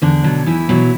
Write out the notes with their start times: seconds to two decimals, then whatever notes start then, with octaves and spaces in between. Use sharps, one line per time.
0.02 E2 D3 D4
0.24 B2 F#3
0.46 E2 E3 E4
0.69 B2 F#3